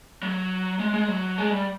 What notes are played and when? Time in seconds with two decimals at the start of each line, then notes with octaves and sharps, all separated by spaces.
0.23 F#3
0.80 G#3
0.94 G#3
1.08 F#3
1.38 G#3
1.51 G3